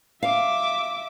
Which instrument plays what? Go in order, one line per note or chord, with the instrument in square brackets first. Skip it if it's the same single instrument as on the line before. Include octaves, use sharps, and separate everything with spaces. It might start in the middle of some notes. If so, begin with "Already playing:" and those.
[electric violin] E5 D6 [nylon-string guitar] F5